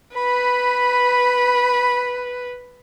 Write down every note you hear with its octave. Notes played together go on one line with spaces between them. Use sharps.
B4 B5